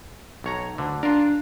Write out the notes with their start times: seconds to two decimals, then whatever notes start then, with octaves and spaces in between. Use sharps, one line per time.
0.44 B1 C#5 A#5
0.78 D2 D3
1.03 D4 F4 A#4